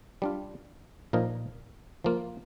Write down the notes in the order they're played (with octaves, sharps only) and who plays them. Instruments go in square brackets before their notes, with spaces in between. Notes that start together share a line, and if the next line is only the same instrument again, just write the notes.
[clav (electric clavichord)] G3 D4 F4
A#2 F3 A#3 D#4 A#4
F3 A#3 F4